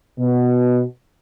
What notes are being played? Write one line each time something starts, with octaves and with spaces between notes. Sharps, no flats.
B2